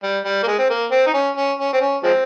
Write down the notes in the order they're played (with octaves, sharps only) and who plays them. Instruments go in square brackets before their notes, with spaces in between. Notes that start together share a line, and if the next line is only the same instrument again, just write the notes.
[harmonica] G3
G3
A#3
G#3
C4
A#3
C4
D#4
C#4
C#4
C#4
C4
C#4
F3 G#3 C4